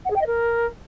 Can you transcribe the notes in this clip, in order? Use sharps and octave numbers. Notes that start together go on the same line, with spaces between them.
F#5
G#4
G5
D#5
A#4